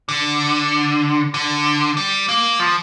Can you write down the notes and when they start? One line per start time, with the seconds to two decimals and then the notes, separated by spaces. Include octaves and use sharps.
0.09 D3
1.34 D3
1.97 G3
2.29 A#3
2.60 F3